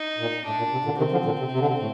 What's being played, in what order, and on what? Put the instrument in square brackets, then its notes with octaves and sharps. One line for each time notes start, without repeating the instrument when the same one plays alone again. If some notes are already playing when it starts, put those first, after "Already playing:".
Already playing: [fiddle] D#4
[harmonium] A#2
[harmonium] A2 [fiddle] D4
[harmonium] A#2
C3
A#2 D3
[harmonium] C3 D#3 [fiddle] C4
[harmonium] D3 F3
A#2 D3
C3
C3
D3
C3
A2